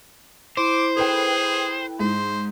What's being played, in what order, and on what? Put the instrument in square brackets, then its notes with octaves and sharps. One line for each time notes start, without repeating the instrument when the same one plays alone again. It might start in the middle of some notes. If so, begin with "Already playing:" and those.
[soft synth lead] E4 [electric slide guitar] C5 [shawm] D6
[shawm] G#4 [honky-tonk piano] A4 B4 G5
[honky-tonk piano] G#2 [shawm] C5